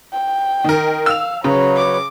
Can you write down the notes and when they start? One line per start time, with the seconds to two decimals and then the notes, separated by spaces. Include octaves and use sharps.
0.13 G5
0.64 D#3 A#4
1.06 F5 E6 F7
1.44 C#3 F#3 B4 C#5 A#5
1.76 D6